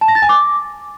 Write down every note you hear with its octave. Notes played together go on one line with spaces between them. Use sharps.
A5
A#6
A6
G#5
D6